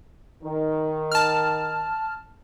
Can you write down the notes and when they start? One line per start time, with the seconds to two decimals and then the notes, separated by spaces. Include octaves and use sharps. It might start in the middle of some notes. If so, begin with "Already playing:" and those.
0.43 D#3
1.12 A5 F6